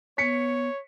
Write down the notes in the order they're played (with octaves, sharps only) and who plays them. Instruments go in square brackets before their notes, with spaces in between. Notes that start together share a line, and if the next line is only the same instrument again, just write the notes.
[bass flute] B3 [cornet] C#5 [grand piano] B6 C#7